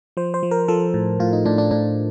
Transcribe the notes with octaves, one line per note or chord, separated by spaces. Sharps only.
F3 C5
C5
F3
A#4
F3 A4
A2
A2 F4
D#4
A2 D4
D4
A2 D4